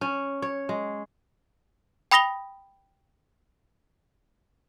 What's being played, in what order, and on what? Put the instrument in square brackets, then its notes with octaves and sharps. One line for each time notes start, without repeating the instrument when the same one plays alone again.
[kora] C#4
C#5
G#3
[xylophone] G5 B5 D#6 A#6 F7 G7